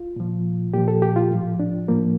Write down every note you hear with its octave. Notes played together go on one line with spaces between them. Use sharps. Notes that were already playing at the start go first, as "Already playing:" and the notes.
Already playing: F4
A#2 F3
A#2 F3 G4
A4
G4
F4
A2 F3
D4
A2 F3 A#3